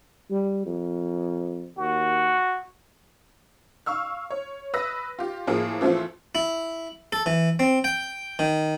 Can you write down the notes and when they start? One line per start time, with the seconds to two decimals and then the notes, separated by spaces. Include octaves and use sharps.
0.30 G3
0.66 F2
1.78 D#2 F#4
3.86 F5 C#6 E6 F6
4.30 C#5
4.74 B4 D#6 E6 A#6
5.19 F4 G4
5.47 A2 F3 A#3 G#4
5.81 E3 F3 A3 C4 F4
6.35 E4
7.12 A4
7.26 E3
7.59 C4
7.84 G5
8.39 D#3